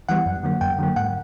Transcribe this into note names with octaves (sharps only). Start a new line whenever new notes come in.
E3 G3 B3 F#5
F#2
D3 F#3 A#3
F#2 G5
D3 F#3 A#3
G#2 F#5